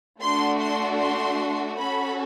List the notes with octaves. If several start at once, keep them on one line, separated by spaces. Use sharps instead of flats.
A3 D4 F#4 C6
C6
C6
C#4 F#4 A4 B5